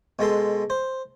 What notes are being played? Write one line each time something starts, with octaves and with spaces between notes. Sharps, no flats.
B2 G#3 A4 C6
C5